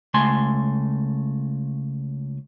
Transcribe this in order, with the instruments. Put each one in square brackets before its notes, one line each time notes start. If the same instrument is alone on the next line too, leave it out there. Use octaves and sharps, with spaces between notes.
[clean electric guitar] C#2 A3 G#5 C6